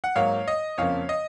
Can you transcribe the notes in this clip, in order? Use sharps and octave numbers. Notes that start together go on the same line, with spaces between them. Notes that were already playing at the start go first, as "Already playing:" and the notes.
F#5
G#2 F#3 A#3 C#5 F5
D#5
F2 C#3 F3 A#3 C#5 F5
D#5